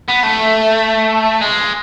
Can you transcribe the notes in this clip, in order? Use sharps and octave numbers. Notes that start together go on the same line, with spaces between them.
B3
A3
G#3